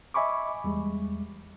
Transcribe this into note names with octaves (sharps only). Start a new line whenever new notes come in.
D#5 E5 G#5 B5 C#6 D6
E2 G3 G#3